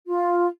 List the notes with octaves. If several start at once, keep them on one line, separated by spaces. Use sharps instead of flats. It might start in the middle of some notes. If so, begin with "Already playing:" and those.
F4